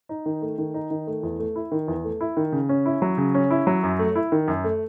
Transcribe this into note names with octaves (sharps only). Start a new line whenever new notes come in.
D#4
D#3
A3
D#3
D#4
D#3
A3
E2
A3
E4
D#3
E2
A3
E4
D#3
C#3
C#4
E4
F#3
C#3
C#4
E4
F#3
F#2
A3
E4
D#3
F#2
A3